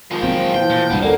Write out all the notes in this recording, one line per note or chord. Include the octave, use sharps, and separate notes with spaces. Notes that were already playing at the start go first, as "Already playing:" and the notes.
D#3 F3 G#3
A#2 F#3 C4 G5
E3 G5
A#2
C#2 G2 G3 B3
D#2 A#2 D3 G3 A#3 C#4